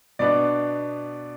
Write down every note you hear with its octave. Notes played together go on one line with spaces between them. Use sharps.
B2 B3 D4 D5